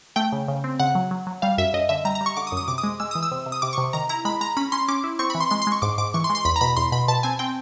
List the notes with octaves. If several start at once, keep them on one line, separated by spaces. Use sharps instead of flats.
A3 G5
C#3
C#3
C4
C#3 F#5
F#3
F#3
F#3
G3 F5
F#2 E5
F#2 D#5
D3 E5
G3 A#5
A#5
G3
C#6
D3 D6
D#6
F#2
D#6
C3 D6
D#6
G#3
G#3 E6
E3 D#6
E6
C3
C3
D#6
C3 D6
C3 C#6
D#3 A#5
E4 A#5
G#3 B5
G#3 A#5
C#4 B5
C#4 C6
C#4 D6
E4
C4 C#6
E3 B5
C6
G#3 C6
C6
G#3 C#6
G#2 D6
G#2 D6
E3 C#6
C6
G#3
C6
E2 B5
A#5
B2 B5
E2 C6
B2 B5
B2 A5
C4 G#5
C4 G5